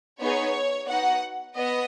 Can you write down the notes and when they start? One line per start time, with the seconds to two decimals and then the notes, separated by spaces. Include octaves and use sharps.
0.20 B3 D#4 G#4 C#5
0.88 B3 D#4 F#4 F#5
1.56 B3 D#5